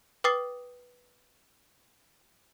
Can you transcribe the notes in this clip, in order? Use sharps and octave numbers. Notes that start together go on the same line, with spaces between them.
B4 G5 D6 D#6 A6 C7